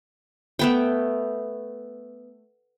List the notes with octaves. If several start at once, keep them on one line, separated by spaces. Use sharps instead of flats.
A3 B3 G5